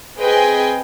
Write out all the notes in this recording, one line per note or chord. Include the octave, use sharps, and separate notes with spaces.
C4 G#4 B4 D#5 G5 G#5